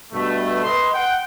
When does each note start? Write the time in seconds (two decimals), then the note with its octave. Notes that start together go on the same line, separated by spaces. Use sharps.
0.12 G2 B2 A3
0.64 B4 D#5 C6
0.94 F#5 G5